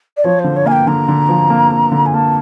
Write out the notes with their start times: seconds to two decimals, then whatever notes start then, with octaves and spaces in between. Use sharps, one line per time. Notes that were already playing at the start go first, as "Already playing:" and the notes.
0.16 D5
0.24 F3 C#5
0.39 C5
0.44 D3
0.56 C#5
0.66 A#3 G#5
0.71 G5
0.87 D3 A#5
1.08 D3
1.29 F3
1.50 A#3
1.71 A#3
1.92 D3
2.06 G#5
2.14 A#3 A5